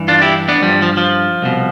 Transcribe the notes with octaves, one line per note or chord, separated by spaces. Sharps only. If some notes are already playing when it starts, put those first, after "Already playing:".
Already playing: G2 E3
D4 F4
E4 G4
B3 D4
G2 F3 G3
F3
F3
C2 B2